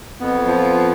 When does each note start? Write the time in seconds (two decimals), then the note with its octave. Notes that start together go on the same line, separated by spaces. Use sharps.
0.20 F2 B3
0.47 F3